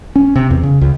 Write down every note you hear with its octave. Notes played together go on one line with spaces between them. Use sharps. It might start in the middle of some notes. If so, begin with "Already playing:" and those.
C#4
C3
E2
C#3
C#2